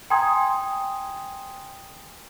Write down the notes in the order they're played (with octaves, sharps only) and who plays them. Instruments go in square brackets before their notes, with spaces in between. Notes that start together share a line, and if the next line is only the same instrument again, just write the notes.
[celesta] G5 G#5 A#5 C6 D#6 G#6